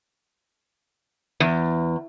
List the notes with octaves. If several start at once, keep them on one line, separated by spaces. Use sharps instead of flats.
E2